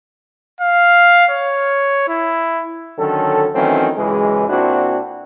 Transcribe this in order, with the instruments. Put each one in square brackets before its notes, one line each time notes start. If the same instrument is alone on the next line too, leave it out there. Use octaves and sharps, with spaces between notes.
[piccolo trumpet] F5
C#5
E4
[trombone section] D3 D#3 F#3 C#4 A4
D#3 E3 F#3 A3 C4 C#4
C#2 F#2 E3 G#3
A#2 C4 D4 E4 F#4